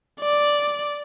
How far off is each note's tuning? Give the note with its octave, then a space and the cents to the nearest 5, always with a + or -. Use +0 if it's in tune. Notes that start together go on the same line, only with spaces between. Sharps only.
D5 +0